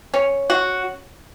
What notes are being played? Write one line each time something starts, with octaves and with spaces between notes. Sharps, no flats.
C#4
F#4